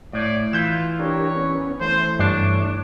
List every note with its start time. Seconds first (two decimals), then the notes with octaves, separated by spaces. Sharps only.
0.13 A2 D5
0.53 E3 F4 G6 E7
0.99 D4 G4 A#4 C#5
1.36 B3 C#4
1.81 E3 A3 C5
2.19 G2 D4 C#5 C7